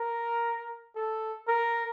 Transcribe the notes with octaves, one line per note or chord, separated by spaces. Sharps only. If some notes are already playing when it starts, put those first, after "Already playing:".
Already playing: A#4
A4
A#4